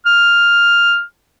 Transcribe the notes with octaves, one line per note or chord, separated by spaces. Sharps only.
F6